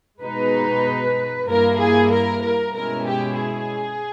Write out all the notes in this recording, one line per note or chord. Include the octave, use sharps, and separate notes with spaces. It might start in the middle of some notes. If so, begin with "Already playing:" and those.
B2 G#3 D#4 B4
G2 G3 A#3 E4 A#4
G#4
A#4
A#4
B2 G#3 C#4 E4 A#4
G4
G#4